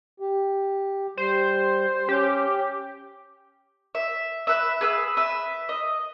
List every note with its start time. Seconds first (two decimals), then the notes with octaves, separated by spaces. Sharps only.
0.20 G4
1.17 G3 C5
2.09 C#4 G4
3.95 E5
4.47 B4 E5
4.81 G#4 B4 E6
5.17 B4 E5
5.69 D#5